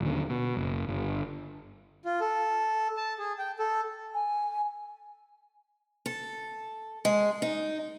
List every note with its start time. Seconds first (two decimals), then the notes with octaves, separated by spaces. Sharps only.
0.01 D#1 D3
0.30 B2
0.57 F#1
0.88 G1
2.05 F4
2.21 A4
2.97 A5
3.19 G#4
3.39 G5
3.59 A4
4.14 G#5
6.06 A4
7.05 G#3
7.42 D#4